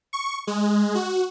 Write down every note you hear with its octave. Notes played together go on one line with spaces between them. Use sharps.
C#6
G#3
F#4